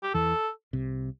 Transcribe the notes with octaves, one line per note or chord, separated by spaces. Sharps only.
G4
E2 E3 A4
C2 C3